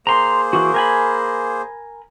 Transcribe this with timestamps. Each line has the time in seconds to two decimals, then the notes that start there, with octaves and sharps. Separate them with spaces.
0.07 A#3 G#4 C5 A#5 C6
0.53 E3 F#4
0.74 A#4 G#5 B5